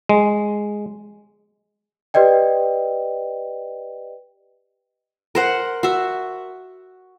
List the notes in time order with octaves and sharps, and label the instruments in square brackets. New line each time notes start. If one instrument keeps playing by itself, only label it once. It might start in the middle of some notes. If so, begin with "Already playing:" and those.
[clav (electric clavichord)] G#3
[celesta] G4 B4 D5 D#5 G5
[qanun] A#4 C5 F#5
F#4 E5